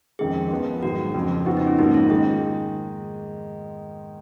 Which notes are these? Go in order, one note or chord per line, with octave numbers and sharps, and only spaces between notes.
F2 D#3 G#3 C#4 G#4
F3 B3 F4
G#2 D#3 F#3 F#4
F2 C#3 F3
F2 F3 B3 D#4 F#4
D#4
C#4
G#2 F3 A#3 C#4 D#4
F4
D#3 G#3 G#4